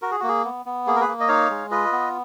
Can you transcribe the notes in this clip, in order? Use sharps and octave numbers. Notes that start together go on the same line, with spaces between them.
F#4 A#4
G#4
A#3 F#4
G#4
B3
B3
A#3 G#4
A#4
G#4 B4
A#3
D#5
D#4 C#5 F5
G#3
F4 B4 D#5
B3